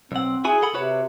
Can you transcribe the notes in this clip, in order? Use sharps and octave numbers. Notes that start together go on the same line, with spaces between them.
B1 C4 F#5
E4 F#4 G#4 G#5
A4 F#5 B5
C3 F#4 B4 C#5